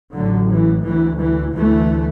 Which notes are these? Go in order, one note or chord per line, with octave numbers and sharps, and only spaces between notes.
A1 A2 D3 F#3
E3
D2 E3
E3
D2 E3 A3